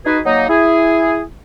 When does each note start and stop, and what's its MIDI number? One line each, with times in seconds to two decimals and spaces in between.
0.06 0.19 63
0.06 0.19 66
0.06 0.19 68
0.06 0.19 71
0.25 0.48 54
0.25 0.48 58
0.25 0.48 63
0.25 0.48 75
0.49 1.23 64
0.49 1.23 68